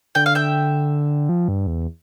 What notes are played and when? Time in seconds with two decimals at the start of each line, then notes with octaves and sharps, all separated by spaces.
0.15 D3 G5
0.26 F5
0.35 E5 G5
1.29 F3
1.48 G2
1.67 E2